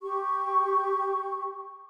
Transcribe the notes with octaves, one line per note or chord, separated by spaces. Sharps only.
G4 C#6